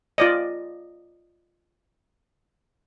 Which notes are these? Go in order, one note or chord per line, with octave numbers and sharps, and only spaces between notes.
F4 D5 D#5